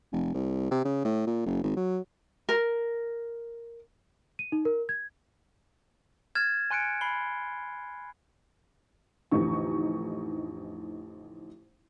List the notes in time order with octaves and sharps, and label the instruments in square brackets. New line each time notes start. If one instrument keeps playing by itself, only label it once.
[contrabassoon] F1
C2
C3
C#3
A2
A#2
F#1
G#1
F#3
[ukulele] A#4
[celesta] D#7
D#4
A#4
G#6
[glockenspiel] F6 G#6 A6 E7
G#5 C6 F#6 C#7 D7
B5 C7 G7
[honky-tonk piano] A1 F2 D3 D#4 C#6